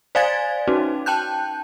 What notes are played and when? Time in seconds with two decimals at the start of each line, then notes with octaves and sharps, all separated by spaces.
0.15 C5 D5 F5 G#5 G#6 A6
0.68 C#4 D#4 F#4
1.06 G5 A5 F#6 G6